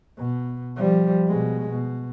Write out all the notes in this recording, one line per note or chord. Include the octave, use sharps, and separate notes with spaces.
B2
F3 G3
B2 G#3
B2